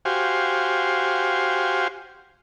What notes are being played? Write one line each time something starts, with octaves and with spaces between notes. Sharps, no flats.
F#4 G4 C5 F5 G#5